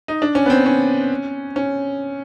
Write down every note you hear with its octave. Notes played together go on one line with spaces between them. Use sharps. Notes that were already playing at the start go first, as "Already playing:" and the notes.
D#4
D4
C#4
B3
C4
C#4
C#4